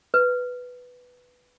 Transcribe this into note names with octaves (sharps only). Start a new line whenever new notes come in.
B4